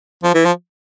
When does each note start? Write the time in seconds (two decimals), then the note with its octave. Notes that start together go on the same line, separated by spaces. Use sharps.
0.24 F3
0.35 E3
0.45 F3